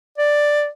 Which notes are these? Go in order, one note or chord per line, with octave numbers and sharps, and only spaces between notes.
D5